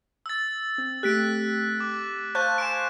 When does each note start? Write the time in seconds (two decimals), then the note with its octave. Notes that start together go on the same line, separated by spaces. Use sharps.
0.26 E6 A6
0.78 C4
1.03 A3 G4 F#6 B6 D7
1.80 D6
2.35 C5 F5 A5 C#6 F#6 G6
2.58 G#5 C6 D7 E7